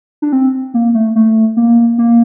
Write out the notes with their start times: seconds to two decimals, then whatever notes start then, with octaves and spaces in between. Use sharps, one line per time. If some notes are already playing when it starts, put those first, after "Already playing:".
0.22 D4
0.33 C4
0.74 A#3
0.94 A3
1.16 A3
1.57 A#3
1.98 A#3